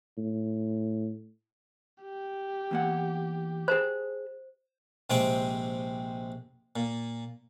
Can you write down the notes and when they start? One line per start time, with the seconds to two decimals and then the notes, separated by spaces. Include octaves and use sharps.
0.17 A2
2.03 G4
2.71 E2 A#3 F#5
3.68 G#4 C5 A5 B5
5.10 A#1 C3 G#3 C4 G5
6.76 A#2